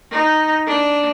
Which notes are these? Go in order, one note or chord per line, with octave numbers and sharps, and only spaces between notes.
D#4
D4